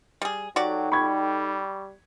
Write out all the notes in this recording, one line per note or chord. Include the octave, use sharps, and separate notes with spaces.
G3 G#4
F#3 D#4 F#4 G4 A4 D5 G5
G3 B5 C#6 G#6